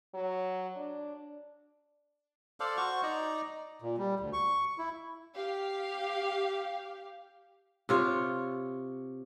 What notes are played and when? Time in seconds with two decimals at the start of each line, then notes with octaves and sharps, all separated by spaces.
0.14 F#3
0.76 D4
2.60 A4 C5 D5 F5
2.77 F#4 C5 C#6
3.03 D#4 D5 A#5
3.82 A#2
3.97 G3
4.20 D2
4.33 C#6
4.78 E4
5.33 G4 F5
7.89 C3 F4 C#5